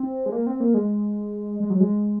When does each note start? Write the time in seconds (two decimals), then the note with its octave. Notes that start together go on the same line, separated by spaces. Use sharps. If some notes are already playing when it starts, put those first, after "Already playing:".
Already playing: C4
0.26 G#3
0.32 A#3
0.47 C4
0.60 A#3
0.74 G#3
1.60 G#3
1.70 F#3
1.80 G#3